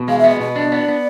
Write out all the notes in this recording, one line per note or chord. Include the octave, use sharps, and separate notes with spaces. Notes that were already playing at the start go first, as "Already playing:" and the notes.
Already playing: B2
G#3 F5
E5
B3 D#5
B2 D#5
D4
B3 D5
B3